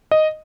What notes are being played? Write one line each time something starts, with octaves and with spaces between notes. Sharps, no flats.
D#5